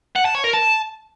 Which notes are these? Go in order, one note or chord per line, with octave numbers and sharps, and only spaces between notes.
F#5
A5
C#5
A#4
A5